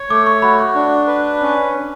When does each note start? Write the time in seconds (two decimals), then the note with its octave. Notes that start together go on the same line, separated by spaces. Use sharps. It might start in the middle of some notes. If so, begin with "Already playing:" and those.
Already playing: C#5
0.10 A3 D6
0.27 C#6
0.42 F#4 B5
0.59 C#6
0.75 D4
1.07 B4
1.41 C#4